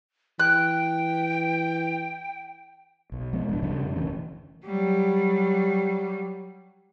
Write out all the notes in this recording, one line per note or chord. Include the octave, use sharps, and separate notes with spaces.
E3 G5 F#6
B1
F3 G#3 B3 C4
D1 D4
C#3 G3 D4
F2 C3
D#1 D2 E3 C#4
F#3 G3